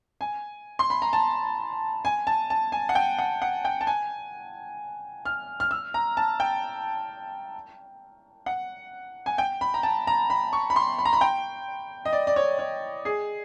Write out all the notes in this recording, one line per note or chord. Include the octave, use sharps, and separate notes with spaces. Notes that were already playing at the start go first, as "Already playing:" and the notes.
G#5
C6
B5
A#5
A5
G#5
A5
A5
G#5
F#5
G5
F#5
F#5
G5
A5
G#5
F6
F6
E6
A#5
A5
G5
F#5
G#5
G5
B5
A#5
A5
A#5
B5
C#6
B5
C6
B5
A#5
B5
G5
D#5
D5
D5
C#5
C#5
G#4